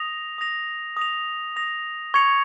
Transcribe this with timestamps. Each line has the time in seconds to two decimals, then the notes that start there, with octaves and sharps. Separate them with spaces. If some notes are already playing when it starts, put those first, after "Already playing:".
Already playing: D#6 A#6 F7
0.38 D#6 A#6 F7
0.97 D#6 A#6 F7
1.56 D#6 A#6 F7
2.14 C#6 G#6 C#7 F7